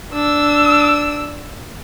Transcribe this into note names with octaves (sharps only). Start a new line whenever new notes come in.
D4 E6